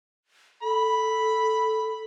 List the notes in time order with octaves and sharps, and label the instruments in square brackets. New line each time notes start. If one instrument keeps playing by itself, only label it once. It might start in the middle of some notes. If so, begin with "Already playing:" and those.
[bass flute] A4 [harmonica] B5